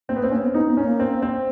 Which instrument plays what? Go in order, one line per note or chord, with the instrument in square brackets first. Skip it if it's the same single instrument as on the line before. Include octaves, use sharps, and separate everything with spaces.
[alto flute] A#3 [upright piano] C4
[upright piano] B3
[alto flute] A#3
[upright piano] C4
[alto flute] A#3 [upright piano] C#4
[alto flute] B3
[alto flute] B3 [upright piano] D#4
[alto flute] B3
[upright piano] C#4
[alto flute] A#3
[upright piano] C4
C4